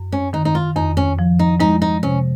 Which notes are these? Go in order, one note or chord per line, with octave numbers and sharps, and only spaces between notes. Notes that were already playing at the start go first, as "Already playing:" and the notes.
Already playing: F#2
C#4
D#3 D#4
D#4
F4
F2 D#4
C#4
F3
D#4
G#3 D#4
D#4
C3 C#4